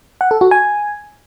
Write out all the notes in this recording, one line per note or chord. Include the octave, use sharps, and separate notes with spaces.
F#5
A4
F#4
G#5